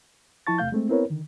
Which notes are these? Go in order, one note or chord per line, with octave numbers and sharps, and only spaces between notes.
F3 E4 A5 C#6 A6
E2 C3 A3 F5 G6
G#3 A3 C4
B3 C4 E4 A#4 B4 C#5
D3 D#3